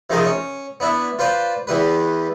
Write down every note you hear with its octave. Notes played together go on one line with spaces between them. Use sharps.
C3 D#3 F3 D#4 G#4 A#4
C#4
B3 D4 E4
F4 B4 C5 D5
E2 E3 G3 B4